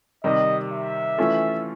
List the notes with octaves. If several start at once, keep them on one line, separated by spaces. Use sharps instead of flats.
C3 D#3 G3 D#5
E5
E3 A3 C#4 F4 A4